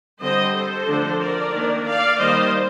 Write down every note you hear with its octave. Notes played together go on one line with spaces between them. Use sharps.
D3 G3 C4 C5 D#5
A4 C5
D3 F3 A3 D4
A#4 D5
D#3 A#3 D4
D5 F5
D#3 G3 A#3 C5 D#5